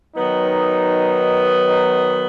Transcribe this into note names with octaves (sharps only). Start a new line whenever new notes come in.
D#3 F#3 B3 D#4
D#4